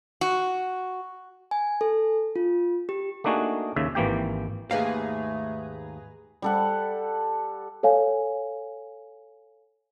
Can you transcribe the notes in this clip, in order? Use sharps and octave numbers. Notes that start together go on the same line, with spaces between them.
F#4
G#5
A4
F4
G4
A3 A#3 D4 D#4 F#4 G#4
D#2 C#3 E5
G#1 E3 A#3 G4 G5
D#2 G#2 A3 G#4 B4 F5 A#5
G3 A4 F#5
A4 C#5 F5 G#5